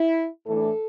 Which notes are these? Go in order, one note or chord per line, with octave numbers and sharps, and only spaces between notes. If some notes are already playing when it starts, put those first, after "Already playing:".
Already playing: E4
A2 E3 A3 D4 A4